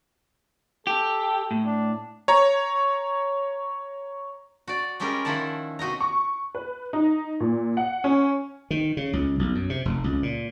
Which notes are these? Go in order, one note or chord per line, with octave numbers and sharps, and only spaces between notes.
G4 A4
A2
D4
C#5 A#5
F#4 D5
G3 G#3 C#4 G4 A#4
D#3 F3 E4 F#5 A5
C3 F#4 D#5 A#5
C#6
B4
D#4
A#2
F#5
C#4
D#3
C#3
C#2
B1
F#2
C3
F1
C#2
A#2